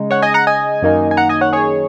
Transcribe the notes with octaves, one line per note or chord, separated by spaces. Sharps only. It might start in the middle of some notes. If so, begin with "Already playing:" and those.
Already playing: C#3 G#3 D#4
C#5 F#5
D#5 G#5
F#5 A#5
D#5 G#5
F#2 D#3 A#3 D#4
G#5
F#5 A#5
D#5 G#5
C#5 F#5
G#4 C#5